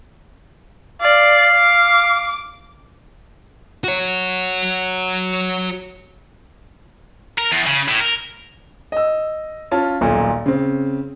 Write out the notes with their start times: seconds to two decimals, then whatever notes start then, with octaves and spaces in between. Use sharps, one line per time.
1.01 D5 F5
1.55 D6
3.84 F#4 C#5
7.38 A#4
7.52 E2
7.67 C#3
7.88 A2
8.01 A#4
8.92 D#5 E6
9.71 C#4 F4 A5
10.01 D#1 B1 A#2
10.46 C#3 C4